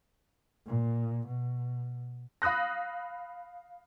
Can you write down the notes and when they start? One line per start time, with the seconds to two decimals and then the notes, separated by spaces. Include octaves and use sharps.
0.67 A#2
1.28 B2
2.42 F5 B5 D#6 F#6 A#6